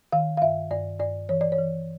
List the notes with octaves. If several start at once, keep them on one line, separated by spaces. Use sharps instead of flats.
D#3 F5
F5
G2 E5
G2 D5
G2 D5
E3 C#5
D5
C#5
E3